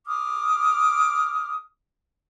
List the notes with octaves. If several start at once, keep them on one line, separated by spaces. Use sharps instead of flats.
D6 D#6 F6